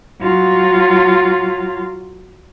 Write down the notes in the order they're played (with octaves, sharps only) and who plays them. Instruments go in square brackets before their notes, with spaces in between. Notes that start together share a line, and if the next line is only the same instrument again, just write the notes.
[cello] F#3 F4